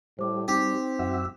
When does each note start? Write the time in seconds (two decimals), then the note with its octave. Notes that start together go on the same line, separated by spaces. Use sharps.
0.19 A2 G3 C5 D6
0.48 C4 D#4 G4
0.99 F#2 F#4 E5